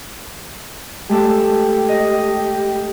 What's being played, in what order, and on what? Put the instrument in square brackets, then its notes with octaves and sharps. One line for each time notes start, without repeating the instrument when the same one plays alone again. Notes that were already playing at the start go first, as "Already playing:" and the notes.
[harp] G#3 A3 A4 [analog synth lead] G4
[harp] D#5